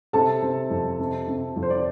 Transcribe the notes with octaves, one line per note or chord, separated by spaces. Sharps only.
C3 A4 A5
C3
F2
C3
C3
F2
C5
D5